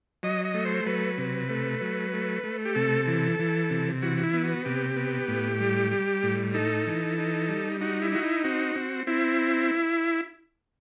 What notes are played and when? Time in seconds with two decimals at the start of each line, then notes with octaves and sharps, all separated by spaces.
0.23 F#3 D#5
0.45 D#5
0.54 A3
0.65 C5
0.86 F#3 B4
1.18 C3
1.49 A3
1.81 F#3
2.13 A3
2.44 A3
2.65 G4
2.75 C3 A4
3.07 E3
3.39 E3
3.70 C3
4.02 E3 F#4
4.17 F#4
4.23 E4
4.34 B3
4.44 F#4
4.65 C3 G4
4.96 B3
5.28 A2
5.60 G3
5.91 G3
6.23 A2
6.54 D#4 A4
6.87 E3
7.18 D#4
7.49 G3
7.81 D#4 F#4
8.02 E4
8.12 D#4 F#4
8.23 E4
8.44 C4 F#4
8.76 C4
9.07 C4 E4